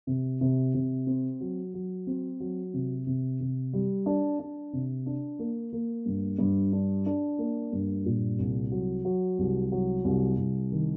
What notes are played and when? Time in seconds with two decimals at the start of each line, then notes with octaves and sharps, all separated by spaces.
0.07 C3
0.41 C3
0.74 C3
1.07 C4
1.40 F#3
1.74 F#3
2.07 C4
2.40 F#3
2.74 C3
3.07 C3
3.40 C3
3.73 G3
4.06 D4
4.39 D4
4.73 C3
5.06 D4
5.39 A#3
5.72 A#3
6.06 G2
6.39 G2
6.73 D4
7.06 D4
7.38 A#3
7.72 G2
8.06 A#2
8.39 C2
8.72 F#3
9.05 F#3
9.38 C2
9.72 F#3
10.04 C2
10.38 C2
10.72 D#3